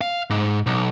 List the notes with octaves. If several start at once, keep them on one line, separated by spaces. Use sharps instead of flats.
F5
G#2
B1